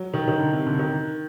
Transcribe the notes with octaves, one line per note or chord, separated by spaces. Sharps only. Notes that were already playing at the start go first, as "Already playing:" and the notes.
Already playing: F#3
D#3
D#3
D3
C3
D3
D#3